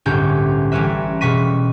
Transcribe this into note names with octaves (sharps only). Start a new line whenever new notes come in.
G1 C2 A2 C#4 G4 G6
A1 G3 C#4 B4 E5
E1 B2 C#6 B6 D#7